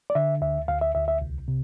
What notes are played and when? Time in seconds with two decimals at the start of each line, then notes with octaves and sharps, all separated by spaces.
0.10 D5
0.15 D3 E5
0.41 D2 E5
0.68 D2 F5
0.81 E5
0.95 D2 E5
1.08 E5
1.22 C2
1.48 C3